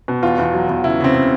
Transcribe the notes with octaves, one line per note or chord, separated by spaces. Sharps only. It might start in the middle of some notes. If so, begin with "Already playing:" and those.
B2
E2 F4
E2
F#3
E2
C#3 E4
C#3 C4
C#3